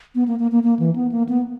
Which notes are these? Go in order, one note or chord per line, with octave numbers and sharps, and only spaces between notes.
B3
A#3
A#3
A#3
A#3
E3
B3
A#3
B3